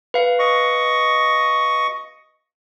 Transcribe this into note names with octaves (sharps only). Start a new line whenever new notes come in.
B4 F5
D#5 C#6